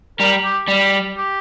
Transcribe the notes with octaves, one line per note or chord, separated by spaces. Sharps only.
G3 A#4
G4
G3
G4